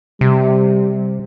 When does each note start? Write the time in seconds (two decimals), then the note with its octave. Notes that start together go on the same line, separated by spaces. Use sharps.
0.21 C3 G3